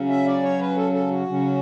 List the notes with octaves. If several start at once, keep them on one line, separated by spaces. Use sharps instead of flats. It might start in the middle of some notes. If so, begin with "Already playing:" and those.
Already playing: C#3 F#3 C#4
E5
D5
C#5
B4
A4
A4
F#4
C#3 F#3 C#4